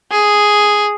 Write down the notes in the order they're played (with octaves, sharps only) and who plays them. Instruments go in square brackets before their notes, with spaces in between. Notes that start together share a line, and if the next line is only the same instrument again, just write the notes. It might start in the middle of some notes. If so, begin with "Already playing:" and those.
[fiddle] G#4